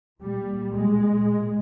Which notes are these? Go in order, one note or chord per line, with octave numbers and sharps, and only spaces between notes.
A#2 G3
G#3
A#2